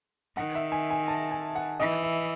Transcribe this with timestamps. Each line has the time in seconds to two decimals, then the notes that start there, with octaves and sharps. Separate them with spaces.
0.37 D#3 F#5
0.55 E5
0.72 G#5
0.90 G#5
1.08 A5
1.31 G#5
1.55 F#5
1.80 E3 D#5
2.03 E5